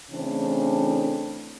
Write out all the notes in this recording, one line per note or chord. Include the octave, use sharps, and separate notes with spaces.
C#3 E3 A3 C4 D4